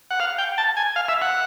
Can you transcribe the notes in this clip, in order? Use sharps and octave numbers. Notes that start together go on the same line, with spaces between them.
F#5
F5
G5
A5
G#5
F5
E5
F#5